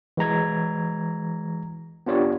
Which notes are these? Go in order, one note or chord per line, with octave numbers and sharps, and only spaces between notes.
E3 G#3 A#5 G#6
B3 D4 F4 G4 C#5 D5